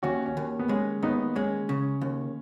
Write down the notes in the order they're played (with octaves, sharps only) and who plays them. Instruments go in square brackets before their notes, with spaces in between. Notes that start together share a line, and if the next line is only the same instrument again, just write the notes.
[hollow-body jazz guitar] D#2 [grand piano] C#4 F#4
[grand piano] C#4
[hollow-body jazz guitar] D#2
[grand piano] B3
[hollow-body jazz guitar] G#3 [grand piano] C#4
[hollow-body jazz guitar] D#2 [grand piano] B3 D#4
[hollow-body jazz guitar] G#3 [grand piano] C#4
[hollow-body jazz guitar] C#3
D#2